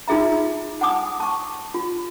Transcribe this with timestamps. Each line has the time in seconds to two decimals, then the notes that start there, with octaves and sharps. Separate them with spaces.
0.08 D#4 F4 G#4 E5 A#5
0.81 F#5 G#5 A5 D6 D#6
1.20 A5 C#6
1.74 F4